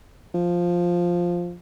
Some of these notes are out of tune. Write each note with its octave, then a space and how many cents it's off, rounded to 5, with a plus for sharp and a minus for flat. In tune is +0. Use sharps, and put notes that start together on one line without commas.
F3 +0